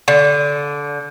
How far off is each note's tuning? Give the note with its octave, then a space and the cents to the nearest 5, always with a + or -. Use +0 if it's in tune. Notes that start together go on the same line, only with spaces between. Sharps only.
D3 -20